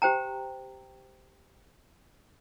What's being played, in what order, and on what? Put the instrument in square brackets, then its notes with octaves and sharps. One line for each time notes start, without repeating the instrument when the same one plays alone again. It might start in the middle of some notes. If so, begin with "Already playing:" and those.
[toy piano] G4 C5 G5 A#5